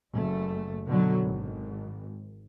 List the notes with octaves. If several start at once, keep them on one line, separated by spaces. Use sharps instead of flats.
F#1 A3
B2 D3 F#3
G#1